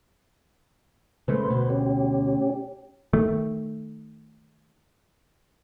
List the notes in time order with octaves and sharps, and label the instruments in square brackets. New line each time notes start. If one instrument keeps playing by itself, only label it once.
[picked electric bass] C#3 G#3 A3 [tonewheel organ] B4 C5
[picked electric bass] D2 B2
[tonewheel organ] C#4 G4
[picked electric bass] D#3 A3